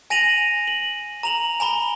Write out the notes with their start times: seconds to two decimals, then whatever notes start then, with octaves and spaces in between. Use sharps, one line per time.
0.10 G#5 A#6 D#7 F7 F#7
0.68 F#7
1.23 A#5 F7 F#7
1.60 G#5 A#5 B5 G7